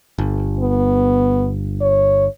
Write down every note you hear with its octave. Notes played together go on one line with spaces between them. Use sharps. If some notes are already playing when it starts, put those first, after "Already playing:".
G1
B3
C#5